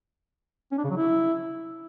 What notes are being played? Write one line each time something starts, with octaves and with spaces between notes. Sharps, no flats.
C#4
D4
C#3
F#3
E4